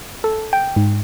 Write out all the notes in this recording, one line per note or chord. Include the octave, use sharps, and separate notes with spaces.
A4
G5
G#2